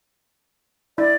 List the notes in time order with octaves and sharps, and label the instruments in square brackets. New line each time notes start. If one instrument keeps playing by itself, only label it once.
[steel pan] E4 [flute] D5